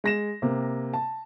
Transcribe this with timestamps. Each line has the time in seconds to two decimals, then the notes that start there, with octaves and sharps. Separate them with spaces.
0.04 G#3 A#6 E7
0.42 C3 A#3
0.94 A5